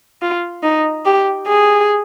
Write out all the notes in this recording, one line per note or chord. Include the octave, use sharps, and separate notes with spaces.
F4
D#4
G4
G#4